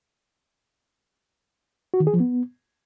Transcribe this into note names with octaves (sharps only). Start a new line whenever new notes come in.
F#4
D#3
G#4
F3
B3